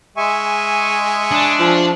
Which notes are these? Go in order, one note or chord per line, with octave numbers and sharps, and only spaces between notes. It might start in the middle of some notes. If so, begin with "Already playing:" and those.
G#3 E5 G#5 C#6
D4
F3